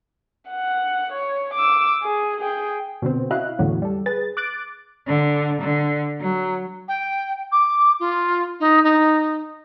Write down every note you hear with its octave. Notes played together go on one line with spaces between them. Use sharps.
F#5
C#5
D6 E6
G#4
G#4 G5
B2 D3 B3 C4
C#4 E4 F#4 D#5 F5 F#6
E2 A2 D3 E3 F#3 C#4
G3 A4
G#4 B4 A6
D6 F#6 A6 D7
D3
D3
F#3
G5
D6
F4
D#4
D#4